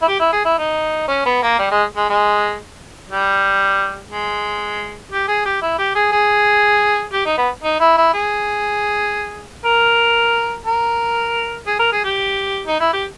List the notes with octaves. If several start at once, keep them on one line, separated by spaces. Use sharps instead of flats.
E4
G4
E4
G#4
E4
D#4
C#4
B3
A#3
G3
G#3
G#3
G#3
G3
G#3
G4
G#4
G4
E4
G4
G#4
G#4
G4
D#4
B3
D#4
E4
E4
G#4
A#4
A#4
G#4
A#4
G#4
G4
D#4
E4
G4